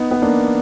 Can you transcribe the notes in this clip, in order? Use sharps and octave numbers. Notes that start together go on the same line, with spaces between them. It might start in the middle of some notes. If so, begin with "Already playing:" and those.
Already playing: B3 D#4
B3
A#3 D4